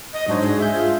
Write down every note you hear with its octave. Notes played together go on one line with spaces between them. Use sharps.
D#5
G#2 F#3 D4 C5
G#3
G#4 E5 G6
F4